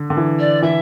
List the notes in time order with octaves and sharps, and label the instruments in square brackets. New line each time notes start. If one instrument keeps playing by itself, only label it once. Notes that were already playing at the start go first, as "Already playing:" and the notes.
Already playing: [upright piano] D3
D3
E3
[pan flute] D5
[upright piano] E3 [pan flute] E5